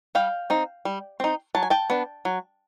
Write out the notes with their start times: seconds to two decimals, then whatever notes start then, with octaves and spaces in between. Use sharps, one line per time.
0.15 G3 F5 G5
0.50 C4 D#4
0.85 G3
1.20 C4 D#4
1.55 F#3 A5
1.63 G#5
1.70 G5 A5
1.90 B3 D4
2.25 F#3